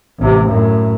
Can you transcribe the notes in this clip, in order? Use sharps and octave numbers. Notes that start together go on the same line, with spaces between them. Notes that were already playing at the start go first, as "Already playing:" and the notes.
A1 C3
F#2 A2